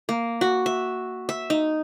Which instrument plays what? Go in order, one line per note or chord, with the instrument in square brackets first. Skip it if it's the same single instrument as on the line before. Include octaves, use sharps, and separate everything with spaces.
[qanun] A#3
F#4
E5
E5
D#4